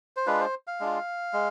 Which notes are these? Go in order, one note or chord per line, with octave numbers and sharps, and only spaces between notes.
C5
G#3 D4 F4 B4
C5
F5
G#3 D4 F4
G#3